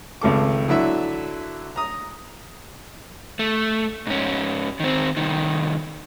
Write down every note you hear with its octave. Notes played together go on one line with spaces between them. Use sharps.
G#1 C#2 A4 D6
D3 F#3 E4 E5 E6
A#5 D#6
A3
G#2 C#4
D#3 C4
C2 D#3